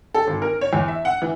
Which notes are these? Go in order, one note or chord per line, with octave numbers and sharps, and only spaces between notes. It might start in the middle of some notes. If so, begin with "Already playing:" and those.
A4
G#1
A#4
C#5
E2
E5
F#5
E3